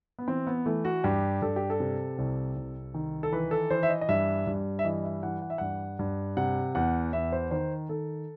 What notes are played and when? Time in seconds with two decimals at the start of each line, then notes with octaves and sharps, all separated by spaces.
0.19 B3
0.28 E3 C4
0.47 B3
0.66 E3 A3
0.85 F#4
1.04 G2 G4
1.42 G2 A4
1.56 G4
1.70 A4
1.80 C3
2.18 C2
2.56 C2
2.94 D#3
3.23 A4
3.32 E3 B4
3.51 A4
3.70 E3 C5
3.83 E5
3.90 D#5
4.01 D#5
4.09 G2 E5
4.47 G2
4.79 E5
4.85 E3 D#5
5.04 E5
5.23 E3 F#5
5.42 F#5
5.50 E5
5.58 G2 F#5
5.99 G2
6.37 C3 F#5
6.75 E2 F#5
7.13 E2 E5
7.32 C5
7.51 D#3 C5
7.89 D#3 A4